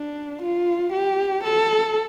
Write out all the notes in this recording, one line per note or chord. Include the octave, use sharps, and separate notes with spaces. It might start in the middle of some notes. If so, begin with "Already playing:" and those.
Already playing: D4
F4
G4
A4